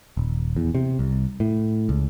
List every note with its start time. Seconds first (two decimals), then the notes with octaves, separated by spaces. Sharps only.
0.17 D#1
0.56 E2
0.75 C3
0.99 C2
1.40 A2
1.89 C#2